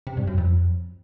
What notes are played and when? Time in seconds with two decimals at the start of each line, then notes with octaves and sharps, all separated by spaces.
0.07 C3
0.17 G2
0.27 F#2
0.38 F2